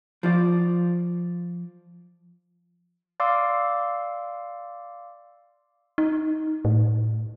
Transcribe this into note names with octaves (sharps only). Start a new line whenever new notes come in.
F3 F4 D5
D5 F5 C6 D6 E6
D#4
A2